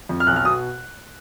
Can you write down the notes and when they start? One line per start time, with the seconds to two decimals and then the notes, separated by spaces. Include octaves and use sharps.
0.09 F2
0.20 F6
0.27 B1 F#6
0.36 F6
0.44 B2 D#6